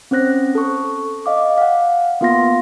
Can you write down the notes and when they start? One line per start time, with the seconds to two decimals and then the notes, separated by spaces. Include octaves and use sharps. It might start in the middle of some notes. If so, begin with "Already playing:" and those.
0.11 C4 C#4 C5 F#6 A#6
0.55 A4 C#6
1.26 D#5 F5 D6
1.58 F5 F#5
2.21 A#3 B3 F4 F5 C6 A#6